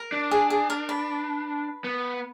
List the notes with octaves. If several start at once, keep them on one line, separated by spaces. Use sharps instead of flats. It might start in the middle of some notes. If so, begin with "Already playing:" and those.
Already playing: A#4
D4
G#4
G#4
A#4
B4
B3